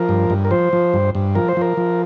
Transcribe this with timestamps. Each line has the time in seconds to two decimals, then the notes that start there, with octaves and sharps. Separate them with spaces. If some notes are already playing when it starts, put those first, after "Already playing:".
Already playing: F3 A#4
0.09 G2
0.30 G2
0.45 A#4
0.51 F3 C5
0.73 F3
0.94 G2
1.15 G2
1.35 F3 A#4
1.48 C5
1.57 F3 A#4
1.77 F3